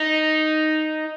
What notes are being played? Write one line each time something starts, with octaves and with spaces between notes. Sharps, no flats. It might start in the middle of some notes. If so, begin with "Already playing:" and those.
Already playing: D#4